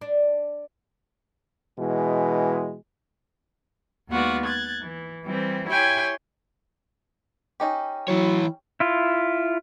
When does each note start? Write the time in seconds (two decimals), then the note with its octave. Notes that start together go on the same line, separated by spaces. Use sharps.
0.01 D4
1.79 B2 E3 G#3
4.09 D#2 G#3 B3 F4 F#4 D5
4.45 F#6 G#6 A6
4.81 E3
5.25 E3 G3 C4
5.68 E4 G4 C#5 G5 G#5 C6
7.60 C#4 D#4 G4
8.08 E3 F#3 E4 C#5
8.80 E4 F4